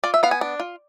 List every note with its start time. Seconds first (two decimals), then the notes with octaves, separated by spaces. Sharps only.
0.04 F4 D5
0.14 E5
0.23 B3 F5
0.31 G#5
0.41 D4
0.60 F4